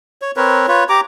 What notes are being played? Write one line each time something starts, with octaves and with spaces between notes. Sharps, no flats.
C#5
C4 A#4 B4 C#5
F4 B4 C#5
G4 A#5 D6